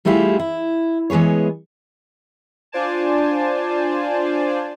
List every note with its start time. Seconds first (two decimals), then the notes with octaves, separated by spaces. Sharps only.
0.05 G3 A3 E4 F4 G4 G#4
0.39 E4
1.10 E3 G#3 B3 G#4 C#5
2.72 D4 F4 C5 D5 G#5 A5